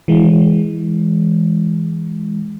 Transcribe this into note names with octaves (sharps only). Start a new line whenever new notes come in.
E3 G#3